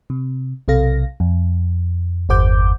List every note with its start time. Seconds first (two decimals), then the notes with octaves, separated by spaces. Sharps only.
0.10 C3
0.68 B1 C3 A4 F5 A#6
1.20 F2
2.29 G1 E2 C5 F#5 D6 G6